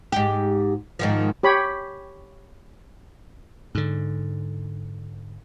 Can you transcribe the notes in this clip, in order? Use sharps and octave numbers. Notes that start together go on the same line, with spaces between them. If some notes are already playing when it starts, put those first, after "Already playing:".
G#2 G4
G#2 D#3 F3
G4 C#5 B5
G#2 D3